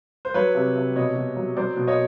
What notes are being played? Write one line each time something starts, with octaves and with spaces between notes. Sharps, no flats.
C5
F#3 B4 C#5
C3
C3
B2 C#5 D#5
B2
F#3
F#3 C5 D5
B2
C#5 D#5